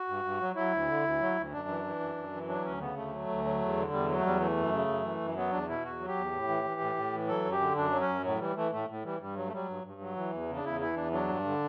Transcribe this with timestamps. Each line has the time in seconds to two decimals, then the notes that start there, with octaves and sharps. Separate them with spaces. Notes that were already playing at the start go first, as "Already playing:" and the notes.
Already playing: F#4
0.08 G2
0.25 G2
0.41 F#3
0.56 F#3 E4
0.72 D2
0.88 D3
1.04 D2
1.20 F#3
1.37 D2
1.52 F#2 D4
1.68 E3
1.84 E3
2.00 F#2
2.16 F#2
2.33 E3
2.48 F#3 D4
2.64 D2 C#4
2.80 C#3 B3
2.96 D2 A3
3.13 F#3
3.29 D2
3.45 F#3
3.61 E2
3.77 D3
3.92 E2 G3
4.08 F#3
4.19 A3
4.24 E2 G3
4.40 E3 A3
4.57 F#2
4.73 C#3
4.88 F#2
5.04 E3
5.20 F#2
5.36 F#3 B3
5.52 E2 D4
5.68 B2 E4
5.84 E2 F#4
6.00 F#3
6.08 G4
6.16 E2
6.32 A2
6.48 E3
6.65 E3
6.81 A2
6.96 A2
7.13 E3
7.28 F#3 A4
7.44 F#2
7.52 G4
7.61 D3
7.76 F#2 D4
7.92 F#3
8.01 C#4
8.09 F#2
8.24 A2 F#3
8.40 E3 G3
8.56 E3 A3
8.72 A2 A3
8.89 A2
9.04 E3 G3
9.20 G2 G3
9.36 F#3
9.47 A3
9.52 F#3 G3
9.68 G2
9.84 G2
10.01 F#3
10.16 E3
10.33 E2
10.49 C#3
10.55 D4
10.64 E2 E4
10.81 E3 E4
10.96 E2 D4
11.12 F#3 D4
11.28 G2
11.45 D3